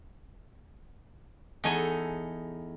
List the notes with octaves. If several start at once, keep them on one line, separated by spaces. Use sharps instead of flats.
E2 D#4 A4 C#5 G#5